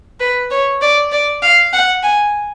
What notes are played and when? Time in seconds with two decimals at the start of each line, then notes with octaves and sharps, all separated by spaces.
0.20 B4
0.51 C#5
0.82 D5
1.12 D5
1.43 F5
1.73 F#5
2.03 G#5